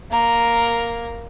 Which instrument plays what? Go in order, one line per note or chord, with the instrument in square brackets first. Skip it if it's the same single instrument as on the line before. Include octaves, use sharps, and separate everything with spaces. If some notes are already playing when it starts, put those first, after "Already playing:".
[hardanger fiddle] A#3 A#4